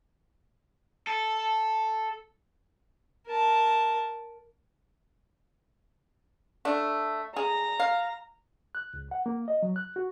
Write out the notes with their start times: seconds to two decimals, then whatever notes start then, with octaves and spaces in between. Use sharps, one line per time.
1.07 A4
3.27 A#4 A5
6.65 A3 D4
7.37 G#4 A#5
7.80 F5
8.75 F#6
8.94 C#2
9.11 F#5
9.26 A#3
9.48 D#5
9.62 F#3
9.76 F#6
9.96 F#4